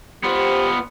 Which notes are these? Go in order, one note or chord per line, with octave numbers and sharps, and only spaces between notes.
B3 F4 G4 C5